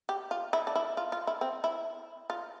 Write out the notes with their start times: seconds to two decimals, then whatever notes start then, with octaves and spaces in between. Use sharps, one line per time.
0.09 G4
0.31 F4
0.53 E4
0.67 D4
0.75 E4
0.97 F4
1.12 F4
1.27 E4
1.41 C4
1.64 E4
2.30 F4